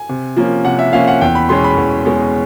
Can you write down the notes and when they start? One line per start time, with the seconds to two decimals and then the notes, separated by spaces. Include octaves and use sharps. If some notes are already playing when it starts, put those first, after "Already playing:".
Already playing: G#5
0.09 C3
0.36 F3 A#3 C#4
0.65 C3 F#5
0.79 E5
0.93 F3 A#3 C#4 F5
1.08 F#5
1.21 E2 G5
1.35 B5
1.49 B2 G#3 C#4 C6
1.64 B5
1.77 E2
2.05 B2 G#3 C#4